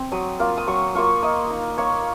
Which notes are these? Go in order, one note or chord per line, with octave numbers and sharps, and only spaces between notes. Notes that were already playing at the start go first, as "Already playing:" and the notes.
Already playing: C4
F#3 D#6
A#3 F4
D#6
F#3 C#6
A#3 F4 C#6
A#3 D#5
D#4
A#3 C#5